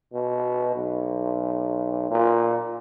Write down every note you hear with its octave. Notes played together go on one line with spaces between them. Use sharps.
B2
B1
A#2